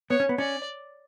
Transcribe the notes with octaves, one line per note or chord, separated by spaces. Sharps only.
B3 C#5
C#4
B3
C#4 D5